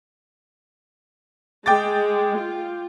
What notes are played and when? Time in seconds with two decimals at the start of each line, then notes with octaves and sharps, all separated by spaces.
1.66 G#3 G5 D6 A6
2.36 F4